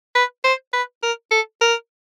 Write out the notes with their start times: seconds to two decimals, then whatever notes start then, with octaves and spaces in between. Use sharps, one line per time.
0.15 B4
0.44 C5
0.73 B4
1.03 A#4
1.31 A4
1.61 A#4